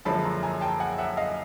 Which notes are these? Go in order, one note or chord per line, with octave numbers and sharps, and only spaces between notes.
F#1 F#2 D3 F3 G#3 A5 B5
A#5 C6
G#5 A#5
G5 A5
F#5 G#5
E5 F#5
D#5 F5